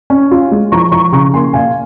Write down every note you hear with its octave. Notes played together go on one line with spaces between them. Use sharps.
C#4
F4
G#3
F3 A#5 C#6
F3 A#5 C#6
C#3 A#5 C#6
A#3 G#5 C6
A#2 F5 G#5